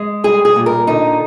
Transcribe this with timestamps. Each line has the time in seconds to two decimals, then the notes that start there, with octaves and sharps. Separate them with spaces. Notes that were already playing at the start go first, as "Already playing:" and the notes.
Already playing: G#3
0.24 G3 G#4
0.45 G#4
0.56 A#2
0.66 A#4
0.87 D3 D#4